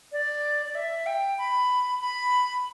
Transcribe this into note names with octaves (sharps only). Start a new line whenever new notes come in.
D5
D5
E5
G5
B5
B5